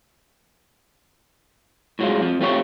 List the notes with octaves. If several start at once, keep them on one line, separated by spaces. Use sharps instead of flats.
A2 F#3 G#3 F4
F2 F3
A3 C4 F4 G4 C#5